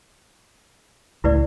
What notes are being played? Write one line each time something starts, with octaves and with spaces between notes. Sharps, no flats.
C#2 A2 E4 B4 D5